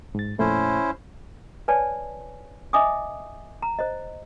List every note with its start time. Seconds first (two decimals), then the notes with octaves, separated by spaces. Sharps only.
0.15 G#2 A6
0.39 F2 A#2 A3 C#4 E4 C5
1.68 B4 C#5 D5 G#5 A5
2.73 D#5 E5 G#5 D6 D#6
3.62 A#5
3.79 C5 D#5